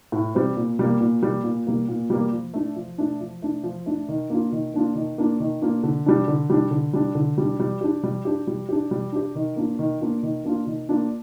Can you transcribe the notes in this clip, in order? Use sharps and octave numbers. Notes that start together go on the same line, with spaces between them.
A2
G3 C4
A#2
G3 A#3
A#2
G3 A#3
A#2
G3 A#3
A#2
G3 A#3
F3
A3 D4
F3
A3 D4
F3
A3 D4
F3
A3 D4
D#3
A#3 D4 F4
D#3
A#3 D4 F4
D#3
A#3 D4 F4
D#3
A#3 D4 F4
D3
G3 D4
D3
G3 D4
D3
G3 D4
D3
G3 D4
G3
D4 G4
G3
D4 G4
G3
D4 G4
G3
D4 G4
D#3
A#3 D4 F4
D#3
A#3 D4 F4
D#3
A#3 D4 F4
D#3
A#3 D4 F4